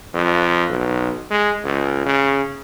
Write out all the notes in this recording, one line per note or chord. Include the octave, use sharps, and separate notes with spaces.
F2
B1
G#3
C#2
C#3